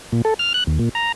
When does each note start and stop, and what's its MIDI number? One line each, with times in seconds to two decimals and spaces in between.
0.12 0.22 46
0.25 0.34 69
0.39 0.53 89
0.54 0.64 90
0.67 0.79 39
0.79 0.89 46
0.95 1.12 82